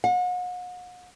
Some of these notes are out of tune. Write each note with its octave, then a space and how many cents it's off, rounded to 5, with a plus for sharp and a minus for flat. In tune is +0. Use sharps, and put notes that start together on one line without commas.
F#5 -40